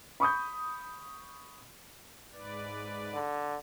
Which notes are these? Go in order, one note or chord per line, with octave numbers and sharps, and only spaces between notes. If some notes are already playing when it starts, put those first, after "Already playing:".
B5 C#6 D#6 G6
G#2 B4 D5
D3